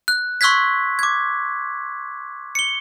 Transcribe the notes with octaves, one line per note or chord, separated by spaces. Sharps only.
F#6
C6 C#6 E6 F#6 G#6 B6
D6 G#6
C#7 G7